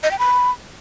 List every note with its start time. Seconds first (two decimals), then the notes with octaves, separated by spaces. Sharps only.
0.03 D#5
0.11 G5
0.19 B5